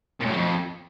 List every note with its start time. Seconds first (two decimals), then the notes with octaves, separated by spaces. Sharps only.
0.20 A#2
0.26 A2
0.31 F#3
0.36 F2